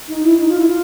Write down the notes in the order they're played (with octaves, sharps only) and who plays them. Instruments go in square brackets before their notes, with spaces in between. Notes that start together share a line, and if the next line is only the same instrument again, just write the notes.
[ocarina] D#4
E4
D#4
F4
E4
F4